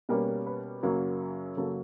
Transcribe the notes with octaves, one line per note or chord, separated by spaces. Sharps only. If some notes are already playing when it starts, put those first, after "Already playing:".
B2 G3 A#3 C#4 A#4
A#4
B4
F#2 C#3 F#3 A#3
F#2 C#3 F#3 A#3 A4